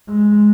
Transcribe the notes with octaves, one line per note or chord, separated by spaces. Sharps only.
G#3